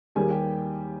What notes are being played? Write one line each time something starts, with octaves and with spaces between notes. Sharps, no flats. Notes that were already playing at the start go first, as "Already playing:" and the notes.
D#2 D#3 G3 A#3 G#4 G#5
G4 G5